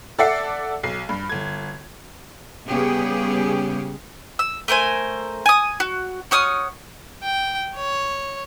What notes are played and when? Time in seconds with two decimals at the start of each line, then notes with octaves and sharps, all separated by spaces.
0.19 A4 D5 E5 F#5 C7 C#7
0.83 B1 C7
1.09 G2
1.29 G1 G#6
2.68 C#3 G3 B3 C#4 G4 G#4
4.39 E6
4.68 A3 A#4 C5 G#5
5.46 G#5 D#6
5.80 F#4
6.31 F#4 C#5 D#6 F6
7.22 G5
7.75 C#5